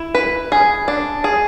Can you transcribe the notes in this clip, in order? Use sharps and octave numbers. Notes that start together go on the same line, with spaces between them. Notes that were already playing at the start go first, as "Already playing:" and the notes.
Already playing: E4
B4
G#4
D4
G#4